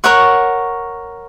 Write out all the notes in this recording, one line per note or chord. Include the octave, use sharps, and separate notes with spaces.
A#4 C#5 F#5 C#6